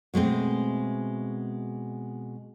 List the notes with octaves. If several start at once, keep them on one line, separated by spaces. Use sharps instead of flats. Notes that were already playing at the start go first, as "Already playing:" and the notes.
B2 G#3 A3 C4